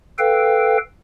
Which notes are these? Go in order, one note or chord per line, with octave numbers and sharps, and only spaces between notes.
A4 B4 F5 G5